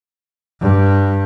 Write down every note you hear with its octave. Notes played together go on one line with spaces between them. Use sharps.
G2